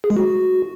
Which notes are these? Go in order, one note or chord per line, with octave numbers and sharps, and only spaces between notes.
G#4
G#3
F#4